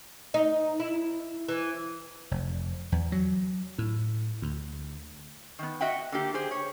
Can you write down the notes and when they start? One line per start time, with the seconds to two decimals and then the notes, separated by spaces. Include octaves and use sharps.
0.34 D#4
0.80 E4
1.48 E3
2.31 F1
2.92 E2
3.12 F#3
3.78 A2
4.42 D2
5.59 D#3 B3
5.81 F#4 D#5 E5 F#5 G5
6.12 D3 A#3 G4
6.34 G4 G#4 C5
6.51 C#5